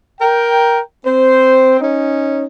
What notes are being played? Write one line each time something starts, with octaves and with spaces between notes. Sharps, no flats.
A#4 G5
C4 C5
C#4 D#4